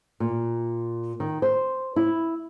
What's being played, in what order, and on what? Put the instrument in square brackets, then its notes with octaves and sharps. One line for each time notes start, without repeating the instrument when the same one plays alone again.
[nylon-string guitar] A#2
D#3
C5
E4